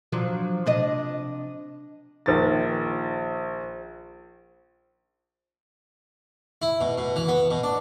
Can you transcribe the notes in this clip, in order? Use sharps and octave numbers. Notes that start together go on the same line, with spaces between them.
F3 F#3 D4
C3 D4 D#5
A#1 D#3 A6
E4
B2
B2
E3
B3
B2
D4